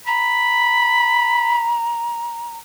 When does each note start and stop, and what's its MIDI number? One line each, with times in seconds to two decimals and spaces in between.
0.07 2.58 82
0.07 1.71 83